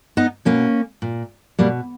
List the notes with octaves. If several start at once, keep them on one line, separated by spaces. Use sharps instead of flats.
B3 D#4
B2 A#3 C#4
A#2
B2 G3 A#3